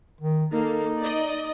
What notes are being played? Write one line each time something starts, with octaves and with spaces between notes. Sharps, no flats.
D#3
A#3 D#4 A4
D5 D#5